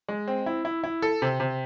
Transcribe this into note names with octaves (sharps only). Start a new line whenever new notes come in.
G#3
C4
E4
E4
E4
A4
C3
C3